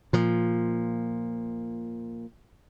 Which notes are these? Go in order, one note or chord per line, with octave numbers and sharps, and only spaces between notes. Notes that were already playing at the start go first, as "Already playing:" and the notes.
A#2 F3